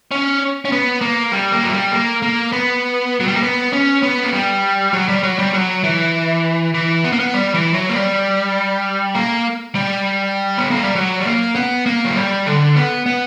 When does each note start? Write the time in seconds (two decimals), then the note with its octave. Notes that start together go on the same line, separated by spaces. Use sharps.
0.11 C#4
0.65 C#4
0.72 B3
1.01 A#3
1.32 G3
1.52 A#3
1.64 F#3
1.72 G3
1.92 A#3
2.22 A#3
2.52 B3
3.20 F#3
3.28 G3
3.35 A#3
3.43 B3
3.73 C#4
4.03 B3
4.23 A#3
4.33 G3
4.93 F#3
5.08 G3
5.23 F#3
5.39 G3
5.54 F#3
5.84 E3
6.74 E3
7.04 B3
7.12 A#3
7.20 B3
7.34 G3
7.54 E3
7.74 F#3
7.89 A#3
7.94 G3
9.15 A#3
9.75 G3
10.58 B3
10.71 A#3
10.83 G3
10.96 F#3
11.19 G3
11.26 A#3
11.55 B3
11.86 A#3
12.05 F#3
12.16 G3
12.46 D3
12.76 B3
13.06 B3